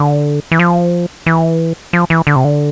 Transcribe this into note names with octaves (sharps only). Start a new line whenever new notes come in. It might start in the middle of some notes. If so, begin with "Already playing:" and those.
Already playing: D3
E3
F3
E3
F3
E3
D3
C3
D3